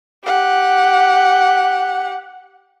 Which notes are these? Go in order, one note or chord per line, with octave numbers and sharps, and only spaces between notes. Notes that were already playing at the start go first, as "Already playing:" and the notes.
G4 F#5